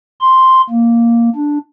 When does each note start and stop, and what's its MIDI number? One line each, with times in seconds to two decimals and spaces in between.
0.21 0.61 84
0.70 1.29 58
1.36 1.58 62